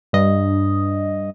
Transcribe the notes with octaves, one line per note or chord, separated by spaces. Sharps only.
G2 D#5